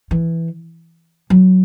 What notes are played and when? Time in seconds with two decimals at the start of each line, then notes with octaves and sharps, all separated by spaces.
0.11 E3
1.30 F#3